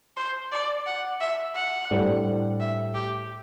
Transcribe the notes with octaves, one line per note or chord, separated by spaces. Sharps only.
C5
D5
F#5
E5
F#5
A2 G3 D4 A4 C5
E5
G4